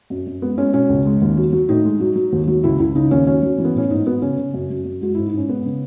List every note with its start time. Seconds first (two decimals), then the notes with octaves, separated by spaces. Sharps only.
0.10 F#2
0.27 F#2
0.42 G#3 B3
0.57 G#3 C#4
0.74 B2 C#4
0.89 C#2
1.06 G#3
1.22 D#2
1.37 F#3
1.53 F#3
1.69 A2 D#4
1.85 G#3
2.00 F#3
2.16 F#3
2.33 D#2
2.47 F#3
2.63 C#2 E4
2.80 C#2 E4
2.95 C#3 D#4
3.11 D#2 C#4
3.27 F#3 C#4
3.43 F#3
3.58 E3
3.65 B3
3.75 A2 C#4
3.90 G#2 D#4
4.06 F#3 B3
4.22 C#3 C#4
4.38 C#3
4.54 F#2
4.70 F#3
4.85 F#2
5.01 G#3 F#4
5.15 G#2 E4
5.26 D#4
5.33 G#2 C#4
5.48 G#3 B3
5.65 C#3